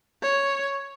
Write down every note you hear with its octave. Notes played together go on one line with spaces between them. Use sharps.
C#5